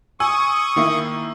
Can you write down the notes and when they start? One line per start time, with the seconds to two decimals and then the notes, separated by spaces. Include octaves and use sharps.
0.20 G#5 C#6 D#6 E6
0.76 D#3 A#3 E4